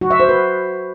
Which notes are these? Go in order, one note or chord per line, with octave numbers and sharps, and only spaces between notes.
F#4
E5
C5
B4